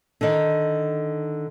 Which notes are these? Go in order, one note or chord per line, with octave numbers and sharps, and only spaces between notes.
D3 D#3